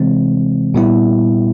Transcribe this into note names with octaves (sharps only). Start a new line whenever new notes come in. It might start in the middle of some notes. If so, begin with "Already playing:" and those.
Already playing: C3 E3 G#3 C4
A#2 G3 B3 E4